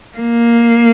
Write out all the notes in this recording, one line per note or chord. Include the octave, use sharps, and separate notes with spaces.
A#3